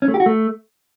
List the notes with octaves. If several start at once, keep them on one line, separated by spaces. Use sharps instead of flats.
C#4
A3
G4
F#4
A3